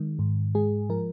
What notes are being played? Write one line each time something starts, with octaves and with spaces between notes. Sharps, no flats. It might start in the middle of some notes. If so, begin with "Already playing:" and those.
Already playing: D#3 G#3
G#2
G#3 G#4
F3 A#4